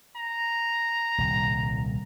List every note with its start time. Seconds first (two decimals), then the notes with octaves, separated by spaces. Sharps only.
0.16 A#5
1.18 D#1 C2 A2